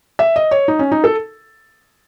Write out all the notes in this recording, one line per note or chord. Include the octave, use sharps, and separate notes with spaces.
E5
D#5
C#5
D#4
C#4
D#4
A4